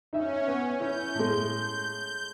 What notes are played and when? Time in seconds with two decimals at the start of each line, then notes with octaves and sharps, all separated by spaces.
0.13 C#4 D#4 E5
0.47 B3
0.80 C#4 E4 G6
1.15 A2 G#3